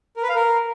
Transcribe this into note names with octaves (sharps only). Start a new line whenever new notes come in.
A#4
B4
F5
A#4